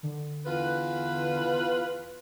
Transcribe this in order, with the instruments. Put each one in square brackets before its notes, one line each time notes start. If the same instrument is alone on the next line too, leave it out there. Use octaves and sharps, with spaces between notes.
[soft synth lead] D3
[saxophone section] E2 F4 B4